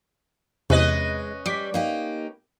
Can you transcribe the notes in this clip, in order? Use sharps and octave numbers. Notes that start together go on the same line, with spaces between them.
E2 C3 G#3 C#4 B4 D#5
G3 D6 B6
A#3 D#4 G4